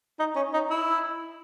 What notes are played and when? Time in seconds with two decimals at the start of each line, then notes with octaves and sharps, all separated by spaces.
0.19 D#4
0.36 C#4
0.53 D#4
0.70 E4